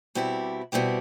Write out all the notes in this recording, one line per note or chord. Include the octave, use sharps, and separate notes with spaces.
B2 G3 C4 E4 G4
B2 G3 C4 E4 G4